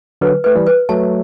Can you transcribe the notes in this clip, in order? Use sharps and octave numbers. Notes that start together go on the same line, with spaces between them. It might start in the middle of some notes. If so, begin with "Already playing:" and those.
D3 F#3 B4
A3 B4
E3 G3
B4
F#3 A3 A5